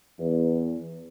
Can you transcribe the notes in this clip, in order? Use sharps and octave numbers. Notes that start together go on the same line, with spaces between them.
E2